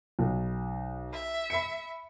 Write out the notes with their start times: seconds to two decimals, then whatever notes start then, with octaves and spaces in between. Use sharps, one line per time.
0.19 B1
1.13 E5
1.50 B5 C#7